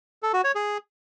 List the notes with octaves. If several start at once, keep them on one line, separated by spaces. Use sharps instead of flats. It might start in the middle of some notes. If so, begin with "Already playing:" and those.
A4
F#4
C#5
G#4